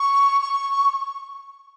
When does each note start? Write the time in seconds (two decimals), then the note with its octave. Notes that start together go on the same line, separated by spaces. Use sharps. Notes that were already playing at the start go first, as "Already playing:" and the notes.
Already playing: C#6
0.42 C#6